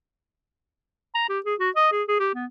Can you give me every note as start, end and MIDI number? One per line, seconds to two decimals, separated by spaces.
1.15 1.27 82
1.29 1.39 67
1.46 1.55 68
1.60 1.70 66
1.76 1.90 75
1.92 2.03 68
2.08 2.16 68
2.20 2.30 67
2.35 2.46 59